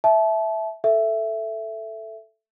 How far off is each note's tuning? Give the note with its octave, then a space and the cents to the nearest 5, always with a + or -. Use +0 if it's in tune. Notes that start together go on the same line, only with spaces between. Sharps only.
E5 -5 A5 -30
A4 +0 E5 +10